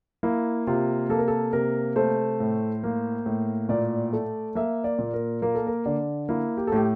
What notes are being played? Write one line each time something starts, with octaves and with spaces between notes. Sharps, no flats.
A#3 E4
C3 F4
A#3 A4
A#4
A4
C3 A#4
A3 C5
A2
A#3
A2
A#2 D5
A3
A#3 E5
D5
A#2
A#4
A#3 A#4
A4
A#4
D3 D5
A#3 E4
G4
A4
A2 G4